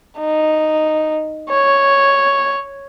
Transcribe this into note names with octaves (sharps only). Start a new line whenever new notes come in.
D#4
C#5